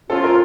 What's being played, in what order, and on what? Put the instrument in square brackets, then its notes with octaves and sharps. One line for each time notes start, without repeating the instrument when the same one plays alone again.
[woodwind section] A2 F3 C#4 F4 [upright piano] A4
[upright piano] A#4